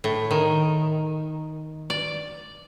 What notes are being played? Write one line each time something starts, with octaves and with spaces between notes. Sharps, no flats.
A2
D#3
D5